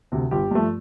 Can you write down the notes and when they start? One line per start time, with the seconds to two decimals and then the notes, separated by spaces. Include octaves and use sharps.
0.12 D2 C3
0.31 G1 G4
0.51 G2 F3 A3